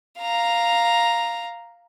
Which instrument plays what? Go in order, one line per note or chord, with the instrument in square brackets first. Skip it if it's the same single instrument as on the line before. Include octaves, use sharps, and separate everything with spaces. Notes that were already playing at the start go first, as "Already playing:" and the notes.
[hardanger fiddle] F5 A#5